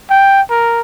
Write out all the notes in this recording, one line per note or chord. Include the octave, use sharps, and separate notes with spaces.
G5
A#4